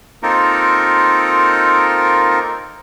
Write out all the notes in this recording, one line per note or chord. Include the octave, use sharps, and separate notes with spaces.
A#3 C4 D#4 F4 A4 A#4